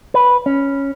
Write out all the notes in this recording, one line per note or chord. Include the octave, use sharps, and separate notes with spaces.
B4
C#4